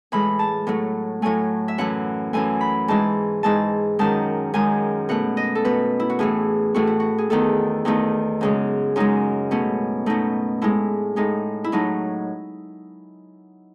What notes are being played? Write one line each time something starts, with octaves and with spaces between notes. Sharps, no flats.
A2 E3 G#3 B5
A5
A2 F#3 A3
A2 F#3 A3 G#5
E5
F#2 E3 A3 F#5
F#2 E3 A3 G#5
B5
G#2 E3 G#3 A5
G#2 E3 G#3 A5
F#2 D#3 G#3 A5
F#2 D#3 G#3 G#5
B2 A3 F#5
D#5
A4
B2 A3 B4
E4
F#4
A2 E3 A3 G#4
A2 E3 A3 F#4
E4
F#4
G#4
E2 D#3 A3 A4
E2 D#3 A3 D#4
F#2 C#3 G#3
F#2 C#3 G#3 D#4
B2 A3 C#4
B2 A3 D#4
A2 G#3 E4
A2 G#3 D#4
E4
A2 F#3 A3 D#4